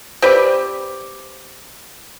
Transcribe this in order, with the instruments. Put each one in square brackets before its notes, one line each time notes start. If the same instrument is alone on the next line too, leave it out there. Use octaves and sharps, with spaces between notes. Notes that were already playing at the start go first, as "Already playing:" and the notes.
[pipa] C4 G4 B4 D5